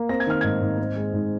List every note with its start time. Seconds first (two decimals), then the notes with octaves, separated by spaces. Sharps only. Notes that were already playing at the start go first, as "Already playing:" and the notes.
Already playing: A#3
0.09 C4 A#6
0.20 G#6
0.27 D#3 F6
0.41 G#2 G#6
0.61 G#2
0.79 C4
0.96 G#3
1.13 G#2